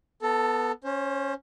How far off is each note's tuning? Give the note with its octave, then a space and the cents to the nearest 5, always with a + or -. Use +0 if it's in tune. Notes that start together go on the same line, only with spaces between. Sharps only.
B3 -5 A4 +0 A5 +40
C#4 +0 C5 +30